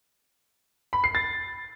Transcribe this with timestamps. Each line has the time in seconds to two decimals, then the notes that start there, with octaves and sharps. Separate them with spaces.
0.93 B5
1.04 C7
1.15 A6